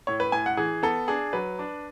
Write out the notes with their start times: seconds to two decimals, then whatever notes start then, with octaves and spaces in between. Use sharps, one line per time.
0.07 A2 C#5
0.20 B4
0.32 A2 G#5
0.46 F#5
0.57 E3 G#4
0.83 B3 A4
1.08 D4 G#4
1.33 F#3 B4
1.59 D4